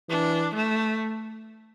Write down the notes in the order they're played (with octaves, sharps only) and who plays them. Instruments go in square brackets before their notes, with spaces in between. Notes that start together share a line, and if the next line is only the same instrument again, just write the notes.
[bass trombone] E3 [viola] D4
[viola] A3